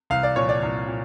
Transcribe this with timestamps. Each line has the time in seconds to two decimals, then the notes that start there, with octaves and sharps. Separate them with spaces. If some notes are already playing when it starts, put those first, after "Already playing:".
0.10 C2 F5
0.23 D5
0.36 A#2 F3 C#5
0.49 D5
0.63 C2
0.88 A#2